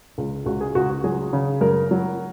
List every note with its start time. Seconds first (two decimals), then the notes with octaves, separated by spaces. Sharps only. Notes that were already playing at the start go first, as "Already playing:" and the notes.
0.18 C#2
0.46 C#2 F#4
0.61 G#4
0.75 C#2 F#4
0.89 F#4
1.04 F#3 G#4
1.33 C#3
1.61 F#2 A#4
1.91 F#3